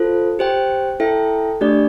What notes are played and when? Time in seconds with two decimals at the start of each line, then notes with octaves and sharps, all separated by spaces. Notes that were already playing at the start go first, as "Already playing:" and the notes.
Already playing: F4 A4 C5
0.39 G4 C5 G5
1.00 E4 A4 E5 G5
1.61 A3 D4 G4 D5